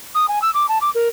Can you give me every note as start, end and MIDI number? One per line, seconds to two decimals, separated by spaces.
0.15 0.26 87
0.28 0.42 80
0.42 0.52 88
0.54 0.66 86
0.69 0.78 81
0.81 0.90 86
0.95 1.08 70